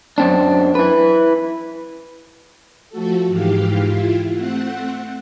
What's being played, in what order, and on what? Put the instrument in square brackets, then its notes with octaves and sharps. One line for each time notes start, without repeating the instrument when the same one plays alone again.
[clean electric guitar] F#2 C4 D4
E4 B4
[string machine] F3 A3 F#4 A4
G#2 E3 G4 F5
E4 F4
A3 C4 F#5